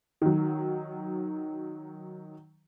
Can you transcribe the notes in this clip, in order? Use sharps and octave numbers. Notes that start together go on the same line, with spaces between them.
D#3 F#3